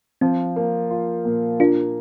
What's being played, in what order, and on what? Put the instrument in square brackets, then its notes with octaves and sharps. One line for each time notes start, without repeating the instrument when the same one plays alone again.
[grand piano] F3 [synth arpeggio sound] C4
[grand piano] A#3
F4
A#2
[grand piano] A#3 [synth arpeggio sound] D4 F4